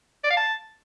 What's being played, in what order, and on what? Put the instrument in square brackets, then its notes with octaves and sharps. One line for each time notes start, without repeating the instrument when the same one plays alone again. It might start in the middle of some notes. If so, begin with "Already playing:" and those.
[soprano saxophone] D5
F5
A5